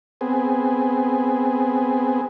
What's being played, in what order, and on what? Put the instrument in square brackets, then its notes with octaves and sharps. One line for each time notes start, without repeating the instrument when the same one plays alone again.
[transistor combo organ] B3 C4 G#4